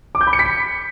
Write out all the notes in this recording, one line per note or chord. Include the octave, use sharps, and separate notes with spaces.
D6
G6
B5
C#7
B6